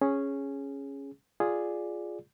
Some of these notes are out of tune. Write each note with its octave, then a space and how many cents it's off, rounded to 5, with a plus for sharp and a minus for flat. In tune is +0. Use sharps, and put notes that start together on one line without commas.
C#4 -5 G#4 +0
F4 +0 G#4 +0 D5 +0